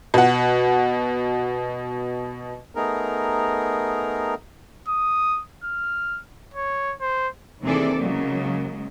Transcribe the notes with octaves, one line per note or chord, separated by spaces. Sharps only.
B2 F#5
A3 B3 D#4 G#4 A#4
D#6
F6
C#5
C5
D#2 C3 E3 G#4 A4 D5
C#3 F#3 G#3 A#3